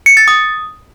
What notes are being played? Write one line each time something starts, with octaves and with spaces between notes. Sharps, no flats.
C#7
A6
D#6